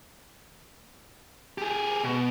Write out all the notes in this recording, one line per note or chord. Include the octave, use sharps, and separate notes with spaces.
G4 G#4
B2